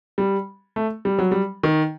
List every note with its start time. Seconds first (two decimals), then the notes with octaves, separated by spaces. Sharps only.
0.18 G3
0.76 A3
1.05 G3
1.18 F#3
1.31 G3
1.63 D#3